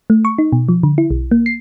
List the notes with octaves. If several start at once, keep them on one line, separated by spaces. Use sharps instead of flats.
A3
C#6
D#4
B2
F3
D3
E4
B1
A#3
C7